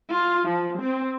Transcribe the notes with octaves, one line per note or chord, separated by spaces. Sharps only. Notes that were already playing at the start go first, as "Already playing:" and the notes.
F4
F3
C4